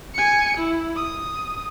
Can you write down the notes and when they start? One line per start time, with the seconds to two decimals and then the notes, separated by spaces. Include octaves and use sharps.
0.15 G#5 C#7
0.57 E4
0.96 D#6